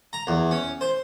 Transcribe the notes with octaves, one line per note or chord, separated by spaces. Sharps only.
A#5
E2
C#4
C5